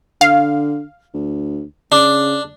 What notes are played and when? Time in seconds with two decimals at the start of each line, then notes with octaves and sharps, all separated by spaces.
0.21 D3 F5
1.14 D2
1.92 C#3 D4